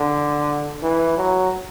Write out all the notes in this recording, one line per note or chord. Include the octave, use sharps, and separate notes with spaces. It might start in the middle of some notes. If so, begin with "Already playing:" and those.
Already playing: D3
E3
F#3